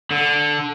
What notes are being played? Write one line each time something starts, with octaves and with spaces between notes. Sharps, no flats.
D3